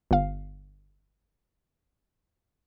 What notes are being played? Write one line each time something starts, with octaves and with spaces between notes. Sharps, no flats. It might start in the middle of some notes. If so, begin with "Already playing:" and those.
G1 F5